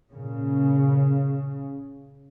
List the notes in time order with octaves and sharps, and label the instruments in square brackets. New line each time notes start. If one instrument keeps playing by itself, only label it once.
[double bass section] A#2 C#3